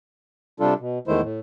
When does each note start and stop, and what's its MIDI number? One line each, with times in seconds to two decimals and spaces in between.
0.60 0.74 48
0.60 0.74 55
0.60 0.74 62
0.60 0.74 65
0.60 0.74 69
0.79 0.98 47
1.08 1.21 40
1.08 1.21 51
1.08 1.21 56
1.08 1.21 57
1.08 1.21 64
1.08 1.21 72
1.22 1.40 45